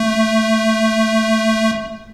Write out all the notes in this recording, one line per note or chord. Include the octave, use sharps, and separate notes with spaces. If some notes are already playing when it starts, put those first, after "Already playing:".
Already playing: A3